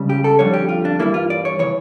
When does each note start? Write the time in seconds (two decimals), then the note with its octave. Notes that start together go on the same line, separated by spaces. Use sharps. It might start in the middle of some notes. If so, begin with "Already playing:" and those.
Already playing: C#2 C#3 G3
0.09 G4
0.24 A4
0.39 F2 D3 G3 C#5
0.54 G4
0.69 F4
0.85 D4
0.99 G2 E3 G3 A#3 E4
1.14 F4
1.30 D5
1.45 C#5
1.59 C#3 E3 C#5